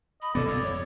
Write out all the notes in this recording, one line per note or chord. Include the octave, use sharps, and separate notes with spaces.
D#5 B5
F1 B2 B3 A4 D5
F2 D5
C#5